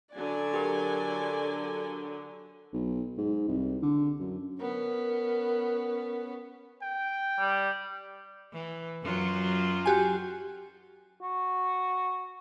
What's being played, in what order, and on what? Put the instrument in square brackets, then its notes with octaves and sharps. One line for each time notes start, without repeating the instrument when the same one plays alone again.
[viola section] D3 F#3 [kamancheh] D5 G#5
[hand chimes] G4 A#4
[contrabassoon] B1
G#2
C2
D3
F#2
[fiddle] B3 C#4 [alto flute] A#4
[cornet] G5
[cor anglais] G3
[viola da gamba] E3
F#2 F#3 F4
[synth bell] F#4 G4 G#5
[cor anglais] F#4